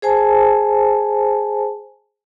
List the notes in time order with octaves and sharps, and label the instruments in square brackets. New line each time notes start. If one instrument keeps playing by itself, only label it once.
[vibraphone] G#4 C5 G#5 A5